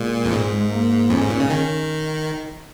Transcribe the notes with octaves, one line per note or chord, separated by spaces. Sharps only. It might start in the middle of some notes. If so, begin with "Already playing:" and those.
Already playing: A#2 G#3
F2
G#2 G#3
A#3
F2 C#4
G#2
A#2
C#3
D#3